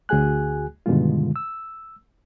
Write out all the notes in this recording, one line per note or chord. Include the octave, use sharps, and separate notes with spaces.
D2 F#4 G#4 G#5 F#6
G2 B2 D3 D#3 G#3 F4
E6